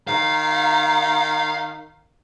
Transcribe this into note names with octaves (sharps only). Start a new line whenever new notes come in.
D#3 F5 A#5